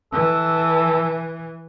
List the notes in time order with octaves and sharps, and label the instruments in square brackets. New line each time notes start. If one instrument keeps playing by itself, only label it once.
[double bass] E3 [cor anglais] A4